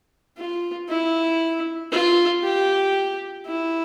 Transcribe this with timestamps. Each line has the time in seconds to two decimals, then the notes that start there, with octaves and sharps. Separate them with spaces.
0.37 F4
0.89 E4
1.92 F4
2.43 G4
3.46 E4